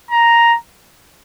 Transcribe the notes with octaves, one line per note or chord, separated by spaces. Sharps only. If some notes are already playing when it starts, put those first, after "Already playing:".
A#5